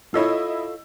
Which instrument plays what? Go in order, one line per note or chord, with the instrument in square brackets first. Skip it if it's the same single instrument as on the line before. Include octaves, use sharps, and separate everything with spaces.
[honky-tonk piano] E4 D#5 E6 [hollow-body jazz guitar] F4 A4 C#5